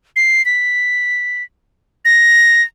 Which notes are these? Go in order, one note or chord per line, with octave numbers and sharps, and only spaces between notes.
C7
B6
A#6